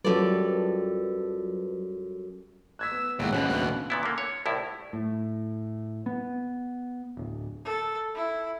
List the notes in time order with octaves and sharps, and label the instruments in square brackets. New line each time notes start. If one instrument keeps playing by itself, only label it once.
[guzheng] F#2 D5 [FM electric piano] F#3 F4 B4 [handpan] G3 A4
[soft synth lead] E6 [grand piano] F#6 G#6 B6
[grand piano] B3
[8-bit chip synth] A1 [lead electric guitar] D#2 F#4 [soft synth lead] G#3
[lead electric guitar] D#2 B2 [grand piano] C#4 [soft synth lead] F#6
[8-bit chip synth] D2
[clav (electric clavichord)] A#2 B3 E4
D3 A#3
C#5
C2 A2 E4
[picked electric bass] A2
B3
D1
[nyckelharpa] A4
E4